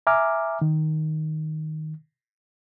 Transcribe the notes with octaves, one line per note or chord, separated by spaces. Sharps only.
E5 G#5 A#5 D6 F6
D#3